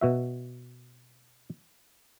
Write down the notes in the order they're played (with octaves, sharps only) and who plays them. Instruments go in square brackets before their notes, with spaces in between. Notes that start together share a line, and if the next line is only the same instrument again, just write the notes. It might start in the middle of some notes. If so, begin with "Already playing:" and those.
[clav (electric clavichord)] B2 F#4 E5